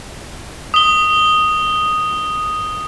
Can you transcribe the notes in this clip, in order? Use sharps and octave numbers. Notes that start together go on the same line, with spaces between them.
D#6 G7